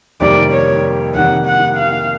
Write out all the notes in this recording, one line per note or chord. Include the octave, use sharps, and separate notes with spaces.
F2 C3 D#3 G3 A#3 D5
C#5
F2 C3 D#3 G3 A#3 F#5
F#5
F5